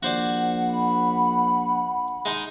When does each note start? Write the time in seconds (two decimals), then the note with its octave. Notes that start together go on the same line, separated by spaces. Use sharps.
0.03 A#1 F#4 C5 D5 F#5
0.68 B5
2.25 G#3 D#4